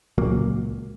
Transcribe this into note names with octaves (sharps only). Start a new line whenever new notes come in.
C#2 A#2 F#3 A#3